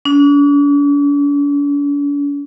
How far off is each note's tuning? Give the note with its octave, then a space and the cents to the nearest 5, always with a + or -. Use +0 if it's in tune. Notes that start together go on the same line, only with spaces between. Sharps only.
D4 -45